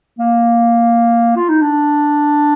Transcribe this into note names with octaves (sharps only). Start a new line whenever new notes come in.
A#3
F4
D#4
D4